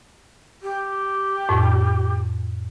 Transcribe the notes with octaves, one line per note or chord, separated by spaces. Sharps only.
G4
F2 A2